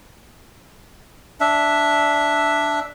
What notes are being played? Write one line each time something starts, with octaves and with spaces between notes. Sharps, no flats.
D4 E5